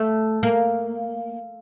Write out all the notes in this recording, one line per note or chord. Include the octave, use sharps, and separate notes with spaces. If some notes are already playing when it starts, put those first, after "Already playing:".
Already playing: A3
A#3